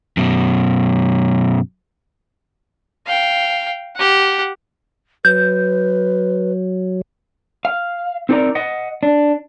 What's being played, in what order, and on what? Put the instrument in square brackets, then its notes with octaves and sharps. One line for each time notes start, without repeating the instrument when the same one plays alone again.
[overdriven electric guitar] F#2 B2
[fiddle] F5 G5
G4 F#5
[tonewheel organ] F#3 [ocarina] B4 [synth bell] G6
[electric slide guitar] F5
C4 D#4 A4 A#4 D5 A#5
D#5 F#5
D4